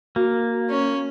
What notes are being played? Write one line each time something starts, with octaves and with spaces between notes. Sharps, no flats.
A#3 F#4
C#4